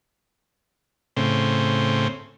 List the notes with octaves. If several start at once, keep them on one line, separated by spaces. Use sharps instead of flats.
A2 C#3 C4